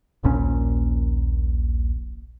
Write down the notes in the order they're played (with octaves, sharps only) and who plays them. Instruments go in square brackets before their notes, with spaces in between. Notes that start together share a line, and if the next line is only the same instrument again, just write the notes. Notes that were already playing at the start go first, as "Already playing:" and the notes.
[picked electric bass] D#1 A#1 A#2 C#4